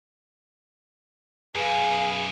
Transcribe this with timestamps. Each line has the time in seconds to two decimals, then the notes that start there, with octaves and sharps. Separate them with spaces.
1.55 F#2 B2 G#4 B4 F5